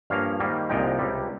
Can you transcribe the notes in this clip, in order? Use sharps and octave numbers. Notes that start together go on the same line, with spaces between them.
G2 F3 A#3 C#4 F5
G#2 D#3 G3 A#3
C2 A#2 F3 G#3 D#4 G5
C#2 C3 G3